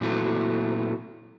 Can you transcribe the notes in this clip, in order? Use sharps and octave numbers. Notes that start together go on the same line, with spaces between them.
A#2 E3 F#3 A3 C4